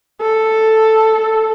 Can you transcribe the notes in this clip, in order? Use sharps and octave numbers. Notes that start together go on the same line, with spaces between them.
A4